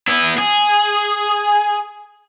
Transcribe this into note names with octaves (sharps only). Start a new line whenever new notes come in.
B3 E4
G#4